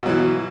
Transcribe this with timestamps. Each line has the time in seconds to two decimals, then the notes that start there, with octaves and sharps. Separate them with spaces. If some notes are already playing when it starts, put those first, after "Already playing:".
0.03 B2
0.06 F#3
0.09 E3